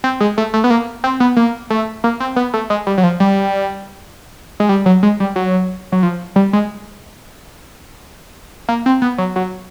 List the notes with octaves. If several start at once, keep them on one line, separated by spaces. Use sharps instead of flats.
C4
G#3
A3
A3
B3
A#3
C4
B3
A#3
A3
A#3
C4
B3
A3
G#3
G3
F#3
F3
G3
G#3
G3
F#3
G#3
G3
F#3
F#3
F3
G3
G#3
A#3
C4
B3
F#3
F#3